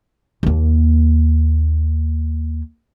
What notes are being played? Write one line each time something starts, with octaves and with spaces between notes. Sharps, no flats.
D#2 A#3